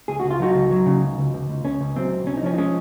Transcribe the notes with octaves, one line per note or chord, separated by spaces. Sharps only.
C#2 G#4
C#2 F#4
F4
F#3 D#4 F#4
C#2
F#3
C#3
C#2
C#2
C#2
C#2
C#2 C#4
C#2
F#3 C4
C#2
C2 C#4
D#4
F3 C#4
D#4
G#3 C#4